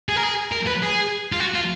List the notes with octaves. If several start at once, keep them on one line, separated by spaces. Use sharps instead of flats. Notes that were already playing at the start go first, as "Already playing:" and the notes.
G#4
A#4
G#4
A#4
B4
G#4
F4
F#4
F4